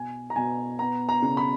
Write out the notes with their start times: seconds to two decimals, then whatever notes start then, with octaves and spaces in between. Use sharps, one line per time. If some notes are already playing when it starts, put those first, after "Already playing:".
Already playing: B2 G#5
0.30 A#5
0.36 B2 G#5
0.79 B3 A#5
1.09 A#5
1.22 C#3
1.37 B5